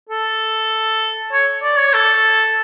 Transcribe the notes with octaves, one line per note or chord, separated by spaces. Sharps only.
A4
C#5
D5
C#5
A4